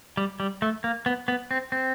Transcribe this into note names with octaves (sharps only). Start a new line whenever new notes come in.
G3
G3
A3
A#3
B3
B3
C4
C4